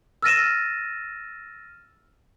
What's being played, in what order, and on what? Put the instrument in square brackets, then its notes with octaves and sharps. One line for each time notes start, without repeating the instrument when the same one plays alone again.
[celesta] E6 F6 A6 A#6 D#7 E7